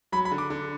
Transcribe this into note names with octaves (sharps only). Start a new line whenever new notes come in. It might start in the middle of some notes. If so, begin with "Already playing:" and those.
F#3 B5
B5
D3
D6
D3